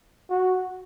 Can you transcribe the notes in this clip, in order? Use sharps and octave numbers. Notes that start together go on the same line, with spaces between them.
F#4